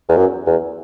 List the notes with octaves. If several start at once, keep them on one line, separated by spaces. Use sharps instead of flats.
E2
F#2
E2